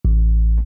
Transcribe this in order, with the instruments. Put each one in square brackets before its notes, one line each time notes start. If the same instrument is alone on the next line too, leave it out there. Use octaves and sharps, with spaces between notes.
[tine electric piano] A1